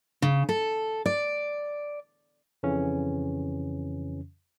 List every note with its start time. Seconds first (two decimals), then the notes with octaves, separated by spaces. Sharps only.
0.22 C#3
0.49 A4
1.06 D5
2.63 F2 C#3 E3 C#4